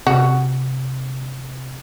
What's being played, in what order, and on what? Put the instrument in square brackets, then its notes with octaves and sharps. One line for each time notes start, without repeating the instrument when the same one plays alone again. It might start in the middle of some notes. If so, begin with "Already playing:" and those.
[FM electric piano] C3 [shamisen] F#4